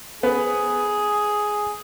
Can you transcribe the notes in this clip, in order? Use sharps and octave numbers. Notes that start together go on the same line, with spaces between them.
B3 G#4